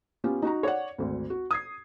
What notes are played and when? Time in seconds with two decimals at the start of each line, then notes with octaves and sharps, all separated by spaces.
0.24 B3 C#4 F4 G4
0.42 D#4 F#4 A#5
0.63 C#5 D5 F#5
0.98 G#1 D2
1.30 F#4
1.51 D#6 G#6 C7